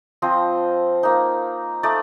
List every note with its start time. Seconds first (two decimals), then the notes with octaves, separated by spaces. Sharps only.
0.22 F3 C4 F4 D#5
1.03 A#3 D#4
1.83 A3 D#4 D5